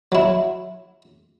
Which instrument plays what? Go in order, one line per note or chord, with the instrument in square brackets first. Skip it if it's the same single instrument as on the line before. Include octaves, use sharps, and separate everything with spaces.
[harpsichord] F#3 E4